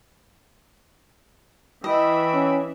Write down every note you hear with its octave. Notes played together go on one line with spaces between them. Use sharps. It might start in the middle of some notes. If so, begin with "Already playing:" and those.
E3 D#5 E5 G5 B5
C#4